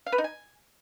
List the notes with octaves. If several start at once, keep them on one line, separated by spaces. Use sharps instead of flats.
F5
B4
D#4
G#5